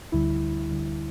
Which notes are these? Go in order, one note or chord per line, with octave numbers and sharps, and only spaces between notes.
D2 D3 G3 E4
D2 D3 G3